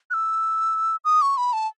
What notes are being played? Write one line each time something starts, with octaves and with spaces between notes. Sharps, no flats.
F#6
E6
D#6
C#6
B5
A5